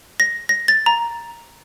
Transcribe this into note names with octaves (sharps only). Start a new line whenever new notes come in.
A#6
A#6
A6
A#5